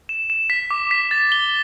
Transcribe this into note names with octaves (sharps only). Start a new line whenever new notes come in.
E7
E7
B6
D6
B6
A6
G7